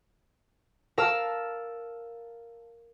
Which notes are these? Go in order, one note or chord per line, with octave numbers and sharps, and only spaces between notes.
A#4 F5 A5 E6 F6